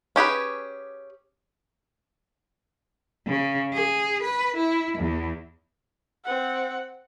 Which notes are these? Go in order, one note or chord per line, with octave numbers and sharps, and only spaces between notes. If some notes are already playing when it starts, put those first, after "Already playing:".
C#4 G4 G#4 B4
C#3
G#4
B4
E4
E2
C4 F#5